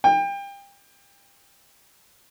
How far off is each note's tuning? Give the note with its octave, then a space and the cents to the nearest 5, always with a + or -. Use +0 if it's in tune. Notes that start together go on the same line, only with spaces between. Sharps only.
G5 +30